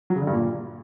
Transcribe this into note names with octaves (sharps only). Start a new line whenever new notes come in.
F#3
C#3
D3
G2
A#2